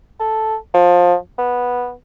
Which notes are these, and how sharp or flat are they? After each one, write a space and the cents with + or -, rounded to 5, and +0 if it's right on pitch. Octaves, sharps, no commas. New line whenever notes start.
A4 -5
F3 +20
B3 -10